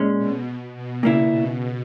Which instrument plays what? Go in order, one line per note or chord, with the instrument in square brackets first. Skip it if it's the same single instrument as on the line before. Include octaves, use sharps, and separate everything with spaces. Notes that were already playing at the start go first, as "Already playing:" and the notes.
Already playing: [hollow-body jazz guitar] A#2 G#3 C#4
[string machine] B2
B2
B2
[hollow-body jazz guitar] A#2 A#3 E4 [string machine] C#3
[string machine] B2